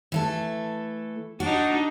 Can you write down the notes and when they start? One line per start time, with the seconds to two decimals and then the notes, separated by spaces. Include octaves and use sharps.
0.12 E3 A3 A4
1.40 D4 D#4 F#4